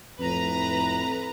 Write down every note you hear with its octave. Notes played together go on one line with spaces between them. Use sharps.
F2 A2 B4 A#5